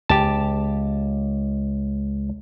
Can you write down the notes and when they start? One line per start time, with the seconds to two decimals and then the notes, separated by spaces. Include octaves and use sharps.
0.10 C#2 G4 A5